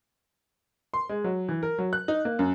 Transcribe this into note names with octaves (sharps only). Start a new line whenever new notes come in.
C6
G#3
F#3
E3
A#4
F#3
F#6
D#4
A#3
F#2